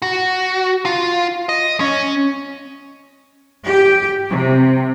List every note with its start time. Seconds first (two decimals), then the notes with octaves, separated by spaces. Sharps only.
0.02 F#4
0.85 F4
1.49 D#5
1.80 C#4
3.65 G4
4.29 C3